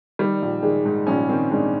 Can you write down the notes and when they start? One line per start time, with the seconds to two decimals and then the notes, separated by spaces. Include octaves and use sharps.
0.19 D#3 G3
0.42 A#1
0.63 D#3 G#3
0.85 G#2
1.07 A#1 C#4
1.29 D#3 C4
1.51 G#2 D4